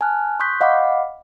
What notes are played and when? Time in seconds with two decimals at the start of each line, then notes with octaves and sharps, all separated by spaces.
0.01 G#5 A5 F6 F#6
0.39 C6 C#6 D#6 F#6 G6 B6
0.61 D#5 F5 F#5 B5 D6